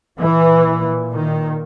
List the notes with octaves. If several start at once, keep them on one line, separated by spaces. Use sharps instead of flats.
A#2 E3
D#3